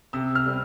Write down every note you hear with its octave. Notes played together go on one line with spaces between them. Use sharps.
C3 E6
F6
G3 C4